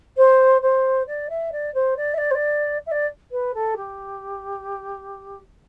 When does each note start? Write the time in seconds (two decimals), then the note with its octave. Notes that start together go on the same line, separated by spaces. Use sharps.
0.17 C5
0.62 C5
1.07 D5
1.29 E5
1.52 D5
1.74 C5
1.96 D5
2.13 E5
2.17 D5
2.30 C5
2.34 D5
2.86 E5
2.91 D5
3.31 B4
3.54 A4
3.76 G4